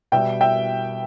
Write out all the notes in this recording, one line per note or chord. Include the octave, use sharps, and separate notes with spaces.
B2 G3 E5 G5
E5 G5